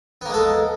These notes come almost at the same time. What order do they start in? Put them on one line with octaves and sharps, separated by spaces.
B3 A#3 G#3 A4